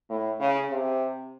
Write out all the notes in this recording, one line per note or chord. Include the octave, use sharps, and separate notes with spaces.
A2
C#3
C3